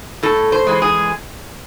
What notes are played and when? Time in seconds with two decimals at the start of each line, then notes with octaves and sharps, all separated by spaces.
0.23 A2 A4
0.52 C5
0.67 E3 G#3
0.82 G#4